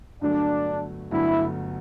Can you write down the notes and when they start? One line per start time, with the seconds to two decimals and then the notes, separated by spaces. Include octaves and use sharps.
0.21 G1 G2 F#3 A3 D4
1.11 G1 G2 F#3 A3 E4